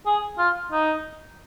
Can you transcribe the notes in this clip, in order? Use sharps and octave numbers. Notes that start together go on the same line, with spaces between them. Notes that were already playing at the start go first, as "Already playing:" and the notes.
G#4
F4
D#4